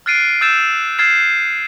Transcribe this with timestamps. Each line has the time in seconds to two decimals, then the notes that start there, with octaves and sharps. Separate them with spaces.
0.06 F6 F#6 A6 C7 D7 D#7
0.41 E6 G6 A6 E7
0.99 F6 G#6 A6 C7 E7